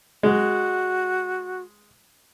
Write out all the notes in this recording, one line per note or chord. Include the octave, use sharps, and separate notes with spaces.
G#3 F#4